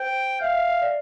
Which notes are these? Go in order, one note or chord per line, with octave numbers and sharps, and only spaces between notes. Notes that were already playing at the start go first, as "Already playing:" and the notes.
Already playing: C5 G5
E5 F5
E5
E5
D5